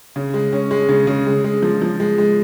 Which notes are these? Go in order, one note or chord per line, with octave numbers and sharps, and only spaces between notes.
C#3
G#3
C#4
G#3
C#3
C#3
G#3
G#3
F3
F3
G#3
G#3